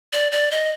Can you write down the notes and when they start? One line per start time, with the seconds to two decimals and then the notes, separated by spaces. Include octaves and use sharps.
0.13 D5
0.32 D5
0.51 D#5